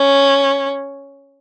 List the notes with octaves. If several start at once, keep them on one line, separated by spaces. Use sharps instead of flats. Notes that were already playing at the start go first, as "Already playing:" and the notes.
Already playing: C#4